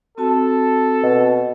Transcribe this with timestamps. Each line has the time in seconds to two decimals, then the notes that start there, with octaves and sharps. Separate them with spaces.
0.18 C4 F#4 A4 A5
1.03 B2